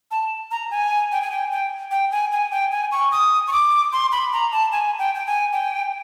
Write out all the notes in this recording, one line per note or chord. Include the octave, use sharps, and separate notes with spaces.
A5
A#5
G#5
G5
G#5
G5
G5
G5
G#5
G#5
G5
G#5
C#6
D#6
C#6
D6
C6
B5
A#5
A5
G#5
G5
G5
G#5
G5